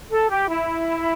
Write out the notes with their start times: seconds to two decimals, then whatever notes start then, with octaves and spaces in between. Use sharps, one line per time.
0.11 A4
0.30 G4
0.49 E4